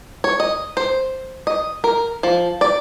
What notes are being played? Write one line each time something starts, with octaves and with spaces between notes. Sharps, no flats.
C#5
D#5
C5
D#5
A#4
F3
D5